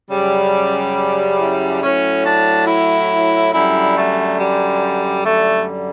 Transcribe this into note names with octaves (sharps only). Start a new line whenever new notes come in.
F#2 C#3 G3
E4
A2 F#3 C#4
D4
E4
F#2 D3 G3 E4
A3
G3
F#2 D3 G3 A3